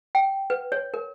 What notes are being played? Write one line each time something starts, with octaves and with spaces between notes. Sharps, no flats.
G5
B4
C#5
A#4